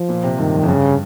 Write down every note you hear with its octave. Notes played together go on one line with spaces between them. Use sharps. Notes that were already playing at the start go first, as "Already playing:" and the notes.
Already playing: F3
A#2
C3
G2 D#3
F2
F2
G2 C#3